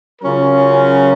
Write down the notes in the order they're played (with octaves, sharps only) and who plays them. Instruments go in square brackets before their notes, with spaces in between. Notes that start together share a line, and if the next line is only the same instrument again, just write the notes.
[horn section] C#3 F#3 C#4 F4 A#4